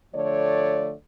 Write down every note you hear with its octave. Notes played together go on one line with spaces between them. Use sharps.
D3 F3 A3 C#5 D5